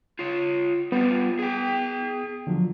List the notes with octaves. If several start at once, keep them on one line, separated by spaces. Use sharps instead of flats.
F4 C#5
G3 B3 F4
G#4 G5
D3 F3 F#3